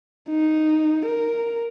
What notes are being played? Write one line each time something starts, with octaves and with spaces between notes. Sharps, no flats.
D#4
A#4